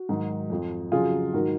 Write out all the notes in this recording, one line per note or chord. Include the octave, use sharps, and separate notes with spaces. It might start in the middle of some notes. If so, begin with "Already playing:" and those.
Already playing: F#4
G#2 D#3 F#3
F2 F3
F2 C#3 F#3 F4 G#4
G#2 D#3 F#3 F#4 A#4